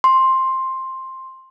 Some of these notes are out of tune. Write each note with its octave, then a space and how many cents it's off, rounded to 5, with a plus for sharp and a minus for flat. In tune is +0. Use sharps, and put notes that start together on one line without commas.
C6 +10